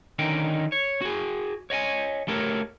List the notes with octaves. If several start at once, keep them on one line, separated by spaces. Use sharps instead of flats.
D3 D#3 C#4 D#4 G5
C#5
F#4 G#4
C#5 D#5 G5 G#5
A3 G4 A4 A#4 C#5